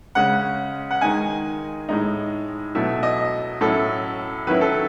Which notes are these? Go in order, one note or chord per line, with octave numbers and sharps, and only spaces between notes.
C#3 G#3 C#4 F#5
F#5
D#3 G#3 D#4 G#5
A2 G#3 D#4
B2 F#3 A3 E4
D#5
A2 F#3 C#4 E4 A4
D#3 F#3 C#4 E4 B4
A4